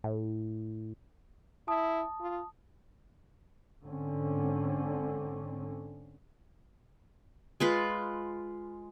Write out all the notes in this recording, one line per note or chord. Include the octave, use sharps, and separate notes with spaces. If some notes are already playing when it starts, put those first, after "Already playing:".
A2
E4 A5 D#6
F4
G#2 D3 C4 C#4
G#3 F4 B4